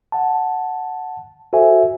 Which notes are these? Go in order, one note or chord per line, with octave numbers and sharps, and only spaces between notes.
F#5 A5
F#4 A4 C5 E5 G#5